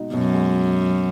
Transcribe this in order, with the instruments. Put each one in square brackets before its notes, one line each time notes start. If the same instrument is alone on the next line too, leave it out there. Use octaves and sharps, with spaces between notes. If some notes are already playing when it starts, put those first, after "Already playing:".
Already playing: [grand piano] B2 G#3 D#4 F#4
[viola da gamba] F#2 [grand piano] B2
[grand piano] G#3